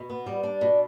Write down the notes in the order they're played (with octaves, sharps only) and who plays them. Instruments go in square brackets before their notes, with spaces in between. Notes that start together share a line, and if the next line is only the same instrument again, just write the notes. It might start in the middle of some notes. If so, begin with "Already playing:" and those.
Already playing: [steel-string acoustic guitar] B2
B3
G3
D4
B2